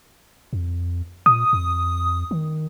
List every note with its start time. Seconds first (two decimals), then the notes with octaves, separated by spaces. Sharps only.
0.53 F2
1.26 A#2 D#6
1.53 F2
2.31 D#3